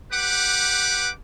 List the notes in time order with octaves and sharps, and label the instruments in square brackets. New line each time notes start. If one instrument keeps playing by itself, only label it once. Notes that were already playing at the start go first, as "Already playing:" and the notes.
[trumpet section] G4 B4 F#5 D6